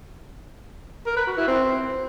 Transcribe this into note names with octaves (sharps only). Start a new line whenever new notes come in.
A#4
B4
F#4
E4
C4